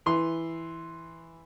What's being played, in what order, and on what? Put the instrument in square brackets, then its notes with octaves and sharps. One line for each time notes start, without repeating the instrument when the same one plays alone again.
[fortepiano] E3 C6